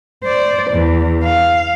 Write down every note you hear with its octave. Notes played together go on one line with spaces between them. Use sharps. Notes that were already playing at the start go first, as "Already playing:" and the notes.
C5 D5
E2
F5